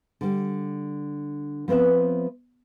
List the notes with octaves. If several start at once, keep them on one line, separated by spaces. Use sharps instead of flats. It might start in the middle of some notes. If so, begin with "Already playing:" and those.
D3 G3
F3 B3 C4 B4 E5